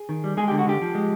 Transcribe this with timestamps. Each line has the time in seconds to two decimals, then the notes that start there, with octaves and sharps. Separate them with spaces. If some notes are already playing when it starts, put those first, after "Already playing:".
Already playing: G#4
0.09 D#3
0.24 G3
0.37 G#3 G#4
0.48 D3 G4
0.58 F#4
0.67 D3 G4
0.81 F3
0.95 G#3